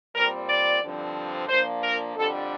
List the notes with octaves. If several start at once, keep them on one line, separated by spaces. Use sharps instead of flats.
A#2 G3 C4 A#4
D5
G2 D3 F3 C4
A#2 F3 A#3 D4 C5
A#4
F2 D3 G3 D4 A4